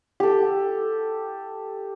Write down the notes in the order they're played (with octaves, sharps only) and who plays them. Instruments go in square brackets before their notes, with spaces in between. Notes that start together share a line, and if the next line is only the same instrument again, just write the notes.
[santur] G4 A4